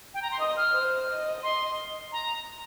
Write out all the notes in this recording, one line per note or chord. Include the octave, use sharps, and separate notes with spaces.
G5
A#5
C6
D#5 D#6
F6
C5
D#5
C6
A#5